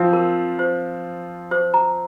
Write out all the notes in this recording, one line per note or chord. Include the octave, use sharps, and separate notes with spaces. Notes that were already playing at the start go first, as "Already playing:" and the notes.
Already playing: F3 C4 F4
A#4
C5
C5
A#5